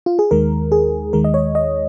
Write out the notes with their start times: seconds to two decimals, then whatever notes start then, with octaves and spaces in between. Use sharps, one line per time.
0.06 F4
0.19 G#4
0.31 D#2 D#3 G#3 A#4
0.72 G#4
1.13 D#2 D#3 G#3 A#4
1.24 D#5
1.34 C#5
1.55 D#5